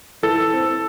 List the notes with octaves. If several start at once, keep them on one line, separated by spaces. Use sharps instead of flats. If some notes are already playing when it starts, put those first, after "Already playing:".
E3 A4
C4